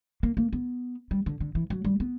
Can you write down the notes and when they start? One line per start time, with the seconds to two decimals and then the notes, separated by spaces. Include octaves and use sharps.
0.23 A#3
0.37 A#3
0.53 B3
1.11 G3
1.26 D3
1.40 D3
1.55 E3
1.70 F#3
1.85 G3
2.00 B3